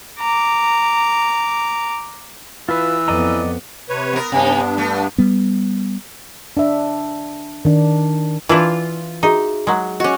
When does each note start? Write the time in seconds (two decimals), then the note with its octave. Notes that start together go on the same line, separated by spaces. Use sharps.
0.19 A#5 D6
2.69 E3 F4 B4 E6
3.08 F2 B3 D5 D#5 A#5
3.89 C3 B4 C#5
4.13 B3 A#4
4.32 G2 C3 B3 D4 D#4
4.78 A3
5.18 G3 B3
6.57 D4 E5
7.65 D#3 D4
8.49 E3 D4 E4 F4
9.23 D#4 F#4 G#4 E5
9.67 F#3 G#3
10.00 C#4 F#4 D#5 D6